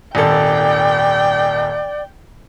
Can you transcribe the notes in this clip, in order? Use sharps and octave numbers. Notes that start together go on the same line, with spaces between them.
D#1 G#1 A4 D5 G5